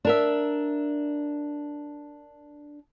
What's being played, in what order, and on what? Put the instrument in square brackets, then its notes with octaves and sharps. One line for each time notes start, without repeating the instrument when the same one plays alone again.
[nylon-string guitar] D4 A#4 E5